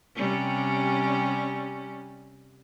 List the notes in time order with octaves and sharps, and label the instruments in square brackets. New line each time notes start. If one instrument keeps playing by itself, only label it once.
[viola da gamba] C3 G3 C#4